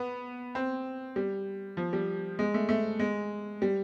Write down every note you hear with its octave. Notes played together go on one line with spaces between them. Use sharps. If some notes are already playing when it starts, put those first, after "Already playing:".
Already playing: B3
C4
G3
F3
G3
G#3
A3
A3
G#3
G3